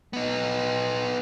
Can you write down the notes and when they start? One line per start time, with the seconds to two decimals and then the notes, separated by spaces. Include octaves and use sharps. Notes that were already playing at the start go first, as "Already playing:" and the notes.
0.13 B3 D#4